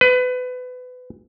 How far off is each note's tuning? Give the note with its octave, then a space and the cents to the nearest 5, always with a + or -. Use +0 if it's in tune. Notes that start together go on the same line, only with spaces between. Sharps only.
B4 +25